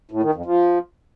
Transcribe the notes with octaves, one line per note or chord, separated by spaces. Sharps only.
A2
D#3
F2
F3